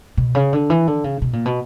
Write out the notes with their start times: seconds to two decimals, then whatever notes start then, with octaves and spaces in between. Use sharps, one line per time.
0.17 B2
0.35 C#3
0.53 D3
0.70 E3
0.87 D3
1.04 C#3
1.22 B2
1.33 A#2
1.46 B2